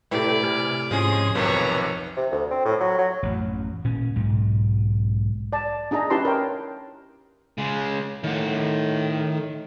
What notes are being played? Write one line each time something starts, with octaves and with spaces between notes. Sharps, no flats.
A2 C3 E4 A4 B4 D5 G5
C3 G#5 F6
G#2 F3 G#3 C#4 G#4 C6 D#6
B1 F2 C3 D#3 B4 C#5 A#5
C3
D2
C4
A2
F#3
F#3
A1 F#2
A#2 C#4
B1 G#2
D5 A5
D4 D#4 G#4 D#5 A#5
C#4 E4 G4 B4 A5 C6
A#4 C#5 G5
C#3 G#3
A2 D#3 F#5